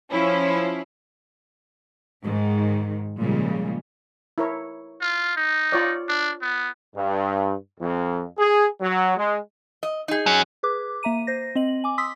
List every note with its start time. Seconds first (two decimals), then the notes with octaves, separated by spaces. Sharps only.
0.12 F3 C#4 E4
2.23 G#2 D#3
3.21 A#2 C#3 F3 G3 G#3
4.38 E4 A#4 C#5
5.01 F4
5.36 D#4
5.72 F4 C#5 D5
6.08 D4
6.42 B3
6.95 G2
7.80 F2
8.39 G#4
8.81 F#3
9.17 G#3
9.83 D#5
10.08 D#4 G#4
10.26 F#3 C#4
10.63 G#4 B4 D6
11.03 A#3 E5 A#5 D#7
11.27 C5 A#6
11.55 C4 D#5 F#7
11.84 G#5 D6
11.98 C6 D#6 E6 B6